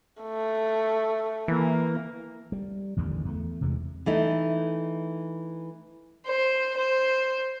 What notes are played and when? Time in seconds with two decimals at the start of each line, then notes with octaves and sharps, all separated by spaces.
0.22 A3
1.48 E3 A#3
2.52 G3
2.97 A1 E2 D3 D#3
3.25 E2 A3
3.61 C3 E3 G#3
4.06 E3 A3 D#4
6.26 C5
6.77 C5